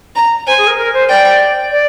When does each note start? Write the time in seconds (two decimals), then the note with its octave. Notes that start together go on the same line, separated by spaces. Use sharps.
0.16 A#5
0.47 C5 G#5
0.58 G#4
0.67 A#4
0.78 A#4
0.93 C5
1.08 D5 G5
1.70 D5